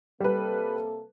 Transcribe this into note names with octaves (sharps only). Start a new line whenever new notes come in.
C3 G3 A#3 A4 B4